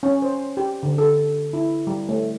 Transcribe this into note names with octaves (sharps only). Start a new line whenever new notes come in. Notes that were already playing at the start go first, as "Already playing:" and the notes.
C#4
C5
G4
D3
A4
E4
G3
A3